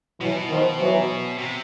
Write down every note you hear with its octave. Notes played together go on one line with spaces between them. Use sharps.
B2 E3 F#3
D#3 F3
E3 F#3
C3